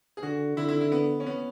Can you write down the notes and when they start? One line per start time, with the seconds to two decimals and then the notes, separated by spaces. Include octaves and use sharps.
0.17 G#4
0.23 D3 F#4
0.57 D3 E4
0.69 E4
0.81 E4
0.92 B3
1.20 C#4
1.26 B3